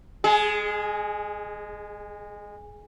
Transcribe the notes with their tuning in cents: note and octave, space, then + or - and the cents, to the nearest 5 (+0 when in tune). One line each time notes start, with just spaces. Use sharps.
G#3 -20 G#4 +20